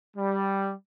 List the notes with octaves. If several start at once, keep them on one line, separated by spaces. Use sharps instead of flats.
G3